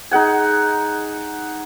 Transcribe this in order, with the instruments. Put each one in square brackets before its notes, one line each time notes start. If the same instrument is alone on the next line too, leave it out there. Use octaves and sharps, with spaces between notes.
[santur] D#4 G#4 F#5 G#5